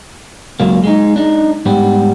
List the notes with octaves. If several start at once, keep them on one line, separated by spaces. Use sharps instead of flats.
C#2 F#3 A#3
G#3 D#4
D4 D#4
G#2 G3 B3